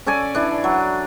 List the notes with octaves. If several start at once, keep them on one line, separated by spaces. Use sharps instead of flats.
C#4 A4 D5 G#5
E3 D4
F#3